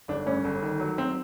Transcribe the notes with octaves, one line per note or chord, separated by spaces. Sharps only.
G1 D4
G2 C#4
G1
D#3
F#3
F#3 C4